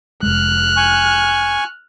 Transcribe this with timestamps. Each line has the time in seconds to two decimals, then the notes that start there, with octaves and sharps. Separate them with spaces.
0.23 F1 G#3 F6 F#6
0.77 G#5 C#6